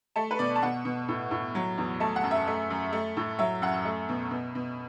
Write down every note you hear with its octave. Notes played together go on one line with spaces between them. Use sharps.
A3 A5
B4
B2 D5
A5
B2 F#5
B2
A2
A2
F#3
E2
A3 A5
F#5
F#2
E5
A3
F#2
A3
A2
F#3 E5
F#2 F#5
A3
B2
B2
B2